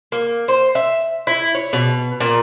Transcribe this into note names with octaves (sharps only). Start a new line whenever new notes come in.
A#3
C5
E5
E4
C#5
B2
A#2